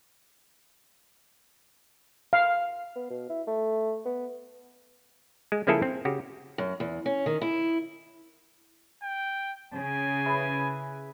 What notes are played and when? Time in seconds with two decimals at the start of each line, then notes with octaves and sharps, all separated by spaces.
2.33 F5
2.96 B3
3.10 B2
3.29 E4
3.47 A3
4.05 B3
5.52 G#3
5.67 C#3 F3 A#3 E4 G#4 A4
5.82 C4
6.05 C#3 F#4 G4
6.58 F#2
6.80 E2
7.06 C#4
7.26 D#3
7.41 E4
9.03 G5
9.74 C#3 G#5
10.26 E4 G#4 B4